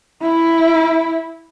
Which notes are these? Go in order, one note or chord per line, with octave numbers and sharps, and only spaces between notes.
E4